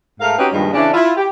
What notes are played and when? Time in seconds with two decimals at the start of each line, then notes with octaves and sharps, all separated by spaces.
0.21 G#2 A3 A#4 F5
0.38 C4 C#4 D#4 F#4 G4 B4
0.53 G2 A#2 D#3 F3 G3 G#3
0.74 C#3 E3 C#4 D4
0.94 E4 F4
1.17 G4